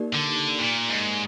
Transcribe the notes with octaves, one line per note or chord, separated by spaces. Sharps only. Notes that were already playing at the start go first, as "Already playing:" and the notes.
Already playing: A#3 D#4 G4 A#4 D5
D3
A#2
G#2